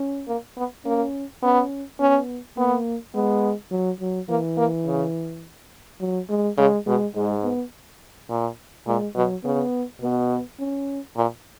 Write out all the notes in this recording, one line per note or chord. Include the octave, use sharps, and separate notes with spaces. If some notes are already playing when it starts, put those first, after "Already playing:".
Already playing: C#4
A#3
B3
A#3 C#4
B3 C#4
B3 C#4
A#3 B3
G#3 B3
F#3
F#3
E3 A#3
A#3
C#3
F#3
G#3
C#3 G#3
B2 G#3
G#2 G#3
B3
A#2
A#2 G#3
B2 F#3
C#3 B3
B2 B3
C#4
A#2